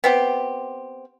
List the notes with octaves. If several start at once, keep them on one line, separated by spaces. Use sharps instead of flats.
B3 C4 G4